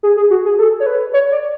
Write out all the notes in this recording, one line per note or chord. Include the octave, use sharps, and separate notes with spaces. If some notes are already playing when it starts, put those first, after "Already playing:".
G#4
G#4
F#4
G#4
A4
C#5
B4
C#5
D5